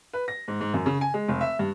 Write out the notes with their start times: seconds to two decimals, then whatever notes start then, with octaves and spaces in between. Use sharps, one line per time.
0.13 B4
0.28 A#6
0.48 G#2
0.61 G#2
0.74 F#2
0.86 C#3
1.01 G#5
1.14 G#3
1.28 F1
1.41 E5
1.59 G2